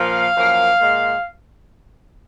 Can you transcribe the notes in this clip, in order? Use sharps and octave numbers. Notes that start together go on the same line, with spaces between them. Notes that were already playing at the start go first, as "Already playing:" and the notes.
Already playing: A#2 F3 A#3 F5
F#2 F3 A#3
A#2 G#3